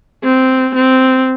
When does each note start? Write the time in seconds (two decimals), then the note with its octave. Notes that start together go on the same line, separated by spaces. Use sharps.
0.24 C4
0.75 C4